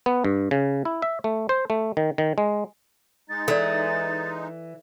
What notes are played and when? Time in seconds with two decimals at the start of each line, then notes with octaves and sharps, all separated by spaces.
0.06 B3
0.25 G2
0.51 C#3
0.85 E4
1.02 E5
1.24 A3
1.49 C5
1.70 A3
1.97 D#3
2.18 D#3
2.38 G#3
3.30 G#3 D#4 A6
3.48 E3 A4 D5